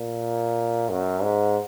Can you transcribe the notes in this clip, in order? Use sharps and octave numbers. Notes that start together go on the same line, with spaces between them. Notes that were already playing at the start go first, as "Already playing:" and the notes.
Already playing: A#2
F#2
G#2